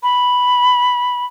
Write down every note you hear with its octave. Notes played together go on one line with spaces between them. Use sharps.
B5